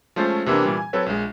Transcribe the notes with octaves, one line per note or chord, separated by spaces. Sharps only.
F3 G#3 A3 C#4 F4 C5
C3 E3 A#3 B3 D4
A#2 E3 G3
G#5
F#3 C4 A4 B4 C#5
A#1 G#3